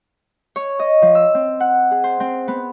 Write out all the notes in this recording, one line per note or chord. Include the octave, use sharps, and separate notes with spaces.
C#5
D#5
F3
E6
C4
F#5
G#4
C5
C4
B3